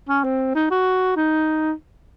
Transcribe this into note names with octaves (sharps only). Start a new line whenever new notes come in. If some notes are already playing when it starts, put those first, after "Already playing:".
C#4
C4
D#4
F#4
D#4